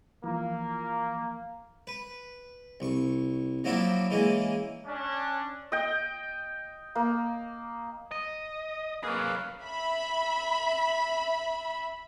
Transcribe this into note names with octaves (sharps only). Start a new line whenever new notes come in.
E3 F3 A#3
B4
C2 C#6
F3 F#3 A#3 D4 E4 F#4
E3 G#3 A#3 C#4
C#4 D4
D#5 G5
A#3
D#5
F#3 A#3 G#4 B4 F5
E5 B5